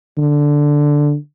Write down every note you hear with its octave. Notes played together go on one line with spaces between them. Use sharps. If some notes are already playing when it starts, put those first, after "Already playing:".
D3